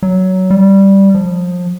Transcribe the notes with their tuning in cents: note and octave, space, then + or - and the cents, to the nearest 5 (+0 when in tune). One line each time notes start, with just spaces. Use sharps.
F#3 +15
G3 -5
F3 +30